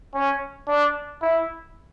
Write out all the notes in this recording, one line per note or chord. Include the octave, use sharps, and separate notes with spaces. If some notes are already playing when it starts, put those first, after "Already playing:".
C#4
D4
E4